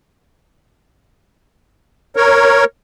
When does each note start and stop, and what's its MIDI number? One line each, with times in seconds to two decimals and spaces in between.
2.16 2.65 70
2.16 2.65 73